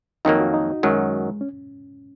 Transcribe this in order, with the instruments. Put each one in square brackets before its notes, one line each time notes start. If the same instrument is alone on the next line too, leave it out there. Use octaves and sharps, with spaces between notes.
[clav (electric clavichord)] F2 D#3 F#3 A#3 [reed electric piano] D#4
[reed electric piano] F#4
D#4
[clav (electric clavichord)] F#2 D#3 F#3 [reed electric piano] G#3
[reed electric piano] C#4